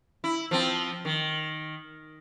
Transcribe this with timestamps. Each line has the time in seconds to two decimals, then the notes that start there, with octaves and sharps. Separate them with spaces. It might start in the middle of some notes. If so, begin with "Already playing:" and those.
0.24 E4
0.51 F3 C4
1.05 D#3